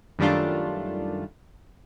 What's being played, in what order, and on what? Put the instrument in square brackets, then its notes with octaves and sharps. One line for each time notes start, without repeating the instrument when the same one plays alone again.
[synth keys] F#2 D#3 G3 A3 D4 F4